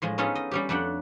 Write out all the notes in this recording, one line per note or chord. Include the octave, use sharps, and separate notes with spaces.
A2 F3 G#3
B3 C#4 D#4 F4 G#4 A4
D#5
G3 C#4 G4
F2 A3 D4 F#5 G5